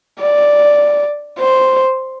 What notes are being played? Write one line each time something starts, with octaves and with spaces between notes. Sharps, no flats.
D5
C5